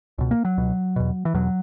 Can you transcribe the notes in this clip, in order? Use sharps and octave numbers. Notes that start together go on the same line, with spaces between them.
C#2 B2
A#3
F#3
C#2 B2
E2 B2
E3
E2 B2 F#3